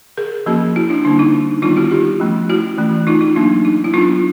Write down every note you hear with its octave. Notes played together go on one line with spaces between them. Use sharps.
G#4 A#4
F3 A#3 C#4 F#4 G#4
E4 F#4
D4 E4
D3 G3 A#3 C#4 D4
D#4
D#3 G3 B3 D4 D#4 F4
E4 F#4
F4 G4
F3 A3 C#4
E4 F#4
E3 A3 C#4
D#4 F4
D#4
F#3 A#3 D4
D#4
E4
F#3 B3 D4 D#4 F4